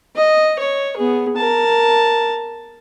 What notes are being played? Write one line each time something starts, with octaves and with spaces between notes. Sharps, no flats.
D#5
C#5
B3 G#4
A#4 A5